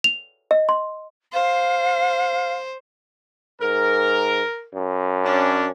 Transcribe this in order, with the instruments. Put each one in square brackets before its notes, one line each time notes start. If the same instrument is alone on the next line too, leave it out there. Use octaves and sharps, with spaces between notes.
[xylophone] F7
D#5
C6
[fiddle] C5 [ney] F5
[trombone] G#2 [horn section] A#4
[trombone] F#2
[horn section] C#4 D4